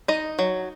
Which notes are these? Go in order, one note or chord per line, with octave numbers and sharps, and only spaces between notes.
D#4 D#5
F#3